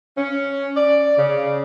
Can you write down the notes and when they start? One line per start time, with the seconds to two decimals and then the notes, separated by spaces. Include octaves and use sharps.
0.17 C#4
0.77 D5
1.18 C#3